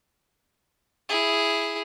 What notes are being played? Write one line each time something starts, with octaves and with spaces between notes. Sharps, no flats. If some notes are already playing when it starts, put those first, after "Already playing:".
E4 G#4